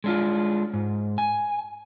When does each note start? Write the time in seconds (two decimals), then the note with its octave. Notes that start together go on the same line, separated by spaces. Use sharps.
0.04 G#3 D4 F4
0.74 G#2
1.18 G#5